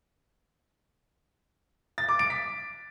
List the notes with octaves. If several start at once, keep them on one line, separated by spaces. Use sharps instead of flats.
A6
D6
D7
B6